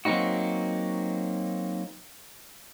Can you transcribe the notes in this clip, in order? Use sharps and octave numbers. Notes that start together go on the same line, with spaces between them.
F#3 A#3 C4 D#4 F#4